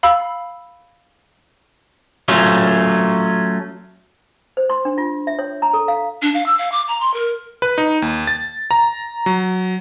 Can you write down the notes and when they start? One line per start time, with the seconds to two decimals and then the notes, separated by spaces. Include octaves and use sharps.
0.03 F5 B5 E6
2.28 F#3 A3 C#4 F4
4.57 C5
4.70 C6
4.85 D4
4.98 F4
5.27 E5
5.39 C#5
5.62 A#5
5.74 A4
5.88 F5
6.22 D4
6.34 F5
6.46 E6
6.58 F5
6.72 D6
6.88 A#5
7.01 C6
7.14 A#4
7.62 B4
7.78 D#4
8.02 D#2
8.27 A6
8.71 A#5
9.26 F#3